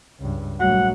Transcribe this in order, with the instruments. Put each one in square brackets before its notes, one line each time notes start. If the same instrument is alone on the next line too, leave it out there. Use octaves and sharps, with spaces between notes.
[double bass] C#2 G2
[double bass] A#1 F#3 [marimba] G3 A3 F#4 [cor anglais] F#5